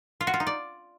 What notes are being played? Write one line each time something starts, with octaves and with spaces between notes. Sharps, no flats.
F4
F#4
F4
D#4
D5